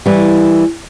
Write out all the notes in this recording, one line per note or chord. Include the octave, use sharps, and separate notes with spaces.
E3 G3